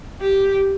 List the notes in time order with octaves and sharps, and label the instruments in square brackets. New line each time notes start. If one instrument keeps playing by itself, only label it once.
[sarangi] G4